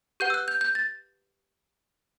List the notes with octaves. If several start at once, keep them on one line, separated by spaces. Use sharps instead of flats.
G4 B4 F#5 G6
E6
F#6
G6
G6
A6